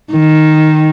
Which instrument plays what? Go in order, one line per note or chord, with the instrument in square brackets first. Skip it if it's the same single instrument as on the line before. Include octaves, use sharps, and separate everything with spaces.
[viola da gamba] D#3